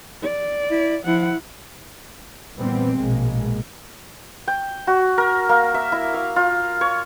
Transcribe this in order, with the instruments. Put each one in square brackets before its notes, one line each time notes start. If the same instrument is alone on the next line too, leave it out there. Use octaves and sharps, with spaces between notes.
[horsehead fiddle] D5
[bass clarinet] E4
[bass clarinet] F3 [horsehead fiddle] E4 F#5
[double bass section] A#2 E3 G3 B3 C4
A#1 B2 G#3 A#3
[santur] G5
F#4
A#4
A#3
E5
E4
F5
F4
C#5